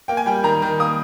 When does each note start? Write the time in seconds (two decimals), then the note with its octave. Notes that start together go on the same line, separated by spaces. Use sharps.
0.08 A#3 G5
0.17 G#5
0.26 G3 G5
0.44 D#3 A#5
0.62 D#3
0.80 A#3 D#6